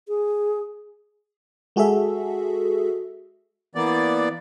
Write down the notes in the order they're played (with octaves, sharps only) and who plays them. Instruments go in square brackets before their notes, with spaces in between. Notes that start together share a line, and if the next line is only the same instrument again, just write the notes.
[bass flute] G#4
[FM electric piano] G#3 F#4 G#4 A4 E5
[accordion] E3 A#3 B3 D5